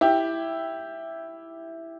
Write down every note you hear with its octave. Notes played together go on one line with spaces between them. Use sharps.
E4 G4